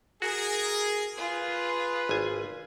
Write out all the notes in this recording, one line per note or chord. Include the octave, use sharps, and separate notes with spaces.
F#4 G#4 A#4
F4 G#4 B4
G#1 G#5